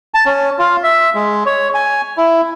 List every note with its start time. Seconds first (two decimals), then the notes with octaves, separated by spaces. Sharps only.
0.14 A5
0.26 C#4
0.59 F4
0.83 E5
1.15 G#3
1.46 C#5
1.74 G#5
2.17 E4